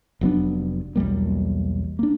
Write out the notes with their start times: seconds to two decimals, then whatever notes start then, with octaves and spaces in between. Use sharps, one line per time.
0.21 F1 F#3 B3 D4
0.96 B1 E2 G3 A#3
1.99 A#3 D4